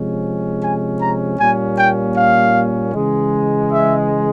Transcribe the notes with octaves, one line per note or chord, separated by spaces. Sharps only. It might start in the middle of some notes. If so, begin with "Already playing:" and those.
Already playing: C3 F3 G#3 C#4
G#5
A#5
A#2 G3 A#3 C#4 G#5
G5
F5
C#3 E3 G#3
E5